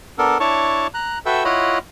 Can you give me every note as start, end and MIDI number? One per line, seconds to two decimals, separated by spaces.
0.18 0.38 59
0.18 0.38 62
0.18 0.38 69
0.18 0.38 70
0.40 0.87 62
0.40 0.87 64
0.40 0.87 73
0.40 0.87 81
0.40 0.87 85
0.94 1.19 82
0.94 1.19 90
1.26 1.44 66
1.26 1.44 69
1.26 1.44 71
1.26 1.44 76
1.26 1.44 79
1.26 1.44 88
1.45 1.78 64
1.45 1.78 65
1.45 1.78 73
1.45 1.78 75
1.45 1.78 78
1.45 1.78 83